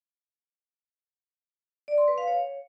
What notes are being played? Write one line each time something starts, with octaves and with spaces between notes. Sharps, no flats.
D5
C6
B4
F5
C#5